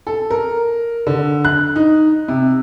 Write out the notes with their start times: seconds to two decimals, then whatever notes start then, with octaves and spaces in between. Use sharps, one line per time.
0.07 A4
0.30 A#4
1.07 D3
1.45 F#6
1.76 D#4
2.28 C3